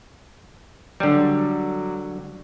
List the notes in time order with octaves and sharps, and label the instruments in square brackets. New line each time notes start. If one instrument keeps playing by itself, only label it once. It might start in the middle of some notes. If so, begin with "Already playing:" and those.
[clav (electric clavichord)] D3 G3 [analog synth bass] F#3